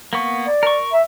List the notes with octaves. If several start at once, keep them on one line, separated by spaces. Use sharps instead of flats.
A#3 B3 C#6
D5
A#4 C#6
E5